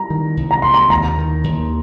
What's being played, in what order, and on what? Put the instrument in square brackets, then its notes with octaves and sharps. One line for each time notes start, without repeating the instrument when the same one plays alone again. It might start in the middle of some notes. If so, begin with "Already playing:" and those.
Already playing: [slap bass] G3 [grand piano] A#5
[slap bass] D#3
C2
[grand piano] A#5
[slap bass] C3 [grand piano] C6
[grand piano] A#5
[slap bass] D#2 [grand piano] A#5
[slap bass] D#3
D#2